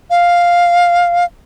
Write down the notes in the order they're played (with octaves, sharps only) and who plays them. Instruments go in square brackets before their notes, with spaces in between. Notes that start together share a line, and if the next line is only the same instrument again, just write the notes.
[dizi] F5